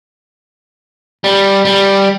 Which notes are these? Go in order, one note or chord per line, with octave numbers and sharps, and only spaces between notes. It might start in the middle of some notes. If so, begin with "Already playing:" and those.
G3
G3